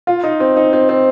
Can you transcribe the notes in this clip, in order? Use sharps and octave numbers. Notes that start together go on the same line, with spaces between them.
F4
D#4
C4
D#4
C4
C4